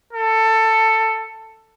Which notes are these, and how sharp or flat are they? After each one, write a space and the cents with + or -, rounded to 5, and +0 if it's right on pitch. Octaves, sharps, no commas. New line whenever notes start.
A4 +15